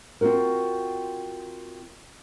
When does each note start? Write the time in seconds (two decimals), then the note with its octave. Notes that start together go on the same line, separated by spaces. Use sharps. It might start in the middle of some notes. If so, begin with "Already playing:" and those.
0.21 C4 C#4 F4 F#4 A#4